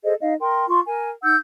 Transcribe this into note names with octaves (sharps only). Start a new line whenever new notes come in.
G#4 A4 C5 D#5
D#4 D#5 F5
A#4 G5 C6
F4 C6 C#6
A#4 G#5
D#4 F#5 E6 G6